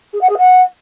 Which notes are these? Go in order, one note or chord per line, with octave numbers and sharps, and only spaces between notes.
G#4
F#5
G#4
F#5